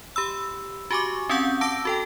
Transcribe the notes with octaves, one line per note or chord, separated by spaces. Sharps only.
G4 B5 E6
F#4 G4 G#5 C#6 D6
C4 C#4 F5 F#5 C#6 G6
A5 D6 E6 A#6 D7
F#4 A4 G5